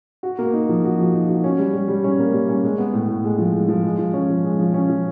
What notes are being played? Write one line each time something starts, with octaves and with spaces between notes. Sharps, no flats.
F#4
A#3
D#4
F3
F#4
F3
D#4
F#4
C#4
G3
G3
G3
C#4
A#3
G3
C#4
G#3
B3
A2
A2
G#3
F3
G#3
F3
G#3
F3
C#4
F3
G#3
F3
C#4
F3